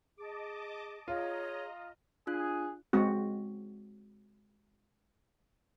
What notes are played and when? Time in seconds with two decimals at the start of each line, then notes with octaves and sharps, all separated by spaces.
0.18 G#4 D#5 A5 D6
1.08 F4 G#4 C#5 D#5 A#5
2.27 D4 F4 G#4 F#6
2.93 G#3 C4 F#4